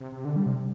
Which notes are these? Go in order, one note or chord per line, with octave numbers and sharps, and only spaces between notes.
C3
C3
D3
G3
C3